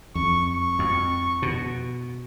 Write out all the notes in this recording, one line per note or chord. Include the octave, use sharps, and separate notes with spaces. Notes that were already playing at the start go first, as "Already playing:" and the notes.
F2 C#6
C#6
F2
B2